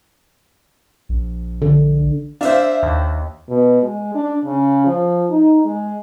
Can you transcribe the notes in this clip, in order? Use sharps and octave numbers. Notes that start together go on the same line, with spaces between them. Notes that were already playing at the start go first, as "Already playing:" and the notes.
A#1
D3
D4 C5 E5 F5
D#2
B2
G#3
D4
C#3
F3
D#4
G#3